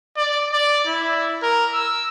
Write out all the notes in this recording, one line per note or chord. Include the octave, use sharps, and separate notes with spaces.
D5
D5
E4
A#4
E6